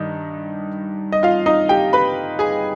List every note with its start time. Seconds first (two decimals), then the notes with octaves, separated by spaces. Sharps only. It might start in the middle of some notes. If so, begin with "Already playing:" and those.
Already playing: G2 D#3 D#4
1.12 D#5
1.23 F4 F5
1.46 D#4 D#5
1.69 G4 G5
1.93 B4 B5
2.39 G#4 G#5